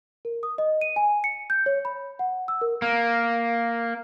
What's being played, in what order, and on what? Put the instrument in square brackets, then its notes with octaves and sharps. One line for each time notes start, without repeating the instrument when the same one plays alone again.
[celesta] A#4
D#6
D#5
D#7
G#5
C#7
G6
C#5
B5
F#5
E6
A#4
[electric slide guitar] A#3